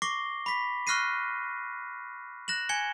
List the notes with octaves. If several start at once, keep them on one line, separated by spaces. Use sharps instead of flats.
C#6 D6 A#6 C7 G7
B5 B6
C#6 F6 F#6 A#6 C7 D#7
F#6 A#6 E7 F#7
G#5 G#6 C#7 G7